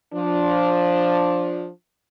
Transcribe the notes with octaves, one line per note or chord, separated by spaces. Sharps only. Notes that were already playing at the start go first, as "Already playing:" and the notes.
F3 D4